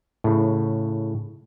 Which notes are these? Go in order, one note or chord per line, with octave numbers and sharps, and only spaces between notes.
A2 C#3